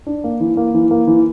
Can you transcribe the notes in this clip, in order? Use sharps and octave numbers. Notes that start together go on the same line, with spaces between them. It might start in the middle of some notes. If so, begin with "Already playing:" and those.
D4
A#3
E3
A#3
E3
A#3
E3